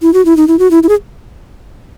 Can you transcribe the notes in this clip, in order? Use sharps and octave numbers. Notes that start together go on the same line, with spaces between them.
E4
F#4
E4
D#4
E4
F#4
E4
E4
G#4